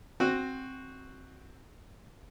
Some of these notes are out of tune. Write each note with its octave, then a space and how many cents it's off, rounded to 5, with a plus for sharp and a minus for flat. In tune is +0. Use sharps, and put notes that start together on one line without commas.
C4 +10 F#4 +0